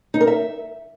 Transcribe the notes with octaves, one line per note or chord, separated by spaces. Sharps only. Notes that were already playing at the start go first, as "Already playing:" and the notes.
D#4
A#4
E5